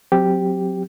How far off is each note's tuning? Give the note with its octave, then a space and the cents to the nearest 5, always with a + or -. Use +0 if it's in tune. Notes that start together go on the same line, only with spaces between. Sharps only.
F#3 -15 C4 +0 G4 +0